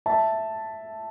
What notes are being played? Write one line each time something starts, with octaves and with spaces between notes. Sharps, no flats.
E5 A5